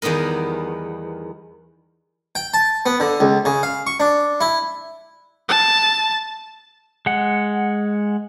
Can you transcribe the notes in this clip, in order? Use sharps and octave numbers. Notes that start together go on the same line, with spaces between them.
E2 D#3 G3 B3 A#4
G5
A5
B3
D3
C#2
C#3
F5
C#6
D4
E4
A5
G#3 F#5